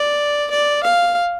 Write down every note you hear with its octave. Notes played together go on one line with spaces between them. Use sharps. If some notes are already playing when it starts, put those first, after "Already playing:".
Already playing: D5
D5
F5